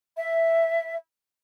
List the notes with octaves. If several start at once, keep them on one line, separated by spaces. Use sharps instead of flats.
E5